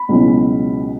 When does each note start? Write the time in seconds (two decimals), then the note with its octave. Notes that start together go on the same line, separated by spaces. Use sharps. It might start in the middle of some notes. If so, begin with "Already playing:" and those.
Already playing: B5
0.09 C#2 B2 F#3 C#4 E4